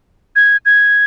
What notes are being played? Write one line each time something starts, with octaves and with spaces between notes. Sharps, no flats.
G#6
G#6